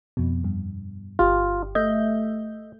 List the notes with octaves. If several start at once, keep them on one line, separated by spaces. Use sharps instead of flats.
F2 B2
G2
G1 F4 G4
A3 D#5 E5 G6